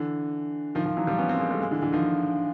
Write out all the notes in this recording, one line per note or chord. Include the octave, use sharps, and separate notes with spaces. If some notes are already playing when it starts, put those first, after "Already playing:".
Already playing: D3 E3
D#3 F3
D#3 F3
E3 F#3
F3 G3
B3 C#4
A#3 C4
G#3 A#3
G3 A3
G#3 A#3
D3 E3
D3 E3
D#3 F3